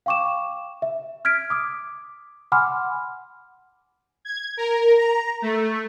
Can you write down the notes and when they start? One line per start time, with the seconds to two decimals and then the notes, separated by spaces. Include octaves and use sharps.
0.06 F5 G5 C#6 D6 E7
0.82 E5
1.25 F6 G#6 B6 D7
1.50 D6 D#6
2.52 F#5 G#5 B5 C6 D6 F6
4.25 G#6
4.57 A#4
4.97 A#5
5.42 A3